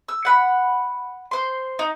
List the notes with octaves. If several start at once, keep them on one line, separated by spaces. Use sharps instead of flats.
E6
F#5 B5
C5 C6
D#4